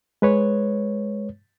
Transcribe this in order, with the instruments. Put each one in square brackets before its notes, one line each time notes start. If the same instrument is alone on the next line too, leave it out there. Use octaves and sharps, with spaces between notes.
[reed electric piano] G#3 B4 C#5